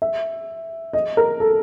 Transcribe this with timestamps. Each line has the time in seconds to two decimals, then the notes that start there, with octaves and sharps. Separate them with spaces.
0.02 E5
0.93 D#5
1.17 A#4
1.40 A4